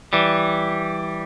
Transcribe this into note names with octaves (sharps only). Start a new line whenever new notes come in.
E3 G3